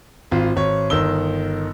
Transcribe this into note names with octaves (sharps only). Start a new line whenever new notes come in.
G#1 F4
G#1 C#5
G1 D#3 E6 G7